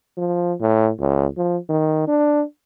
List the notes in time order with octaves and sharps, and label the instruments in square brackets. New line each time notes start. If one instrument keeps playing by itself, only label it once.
[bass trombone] F3
A2
C#2
F3
D#3
D4